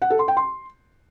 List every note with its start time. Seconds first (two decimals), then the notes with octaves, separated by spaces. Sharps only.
0.02 F#5
0.10 A4
0.19 C6
0.28 G5
0.37 C6